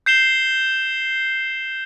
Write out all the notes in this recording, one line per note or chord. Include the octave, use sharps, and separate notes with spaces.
G6 C7 E7 G7